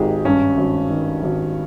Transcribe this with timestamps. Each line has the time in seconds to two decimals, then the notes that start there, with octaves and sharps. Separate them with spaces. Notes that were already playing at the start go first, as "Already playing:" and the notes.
Already playing: G#1 D#3 G#3 G4 G#4
0.25 G2 C#4
0.58 G#1
0.90 D#3
1.23 G#1